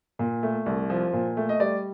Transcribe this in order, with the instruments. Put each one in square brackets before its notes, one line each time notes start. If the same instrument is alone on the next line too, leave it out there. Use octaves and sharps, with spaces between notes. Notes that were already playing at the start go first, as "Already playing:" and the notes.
[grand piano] A#2
A3
C2
F3
A#2
A3
D#5
G3 D5